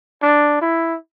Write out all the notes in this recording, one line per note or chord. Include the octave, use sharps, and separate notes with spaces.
D4
E4